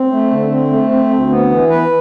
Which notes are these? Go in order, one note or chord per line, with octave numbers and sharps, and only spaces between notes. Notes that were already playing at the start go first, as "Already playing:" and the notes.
Already playing: C4
A3
D3
C4
A3
C4
D2
B3
E3
B4